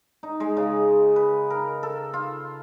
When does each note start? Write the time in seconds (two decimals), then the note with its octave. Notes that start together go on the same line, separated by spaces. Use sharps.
0.23 D#4
0.40 G#3
0.57 C#3
1.16 B4
1.50 A#4
1.83 A4
2.14 F4